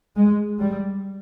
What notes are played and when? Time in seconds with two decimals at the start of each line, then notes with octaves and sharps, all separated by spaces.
0.16 G#3
0.61 G3